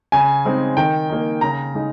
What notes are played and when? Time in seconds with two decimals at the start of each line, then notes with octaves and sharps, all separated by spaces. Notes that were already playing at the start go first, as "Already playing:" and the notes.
0.12 C#3 G#5
0.45 G#3 C4 D#4
0.77 D#3 G5
1.10 A#3 D#4
1.41 C#3 A#5
1.74 G#3 D#4